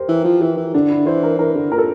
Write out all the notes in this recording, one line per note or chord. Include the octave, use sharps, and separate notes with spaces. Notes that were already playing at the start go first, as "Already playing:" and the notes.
Already playing: G4 A#4 C5
E3
F3
E3
E3
D3 D4
E4
E3 C5
A#4
E3 A#4
D3
A#2 A#4
A4